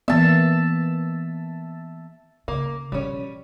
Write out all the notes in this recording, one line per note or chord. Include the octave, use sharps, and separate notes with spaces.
E3 A#3 B3 E5 A5
C#3 A#3
B2 F3 G3 C#4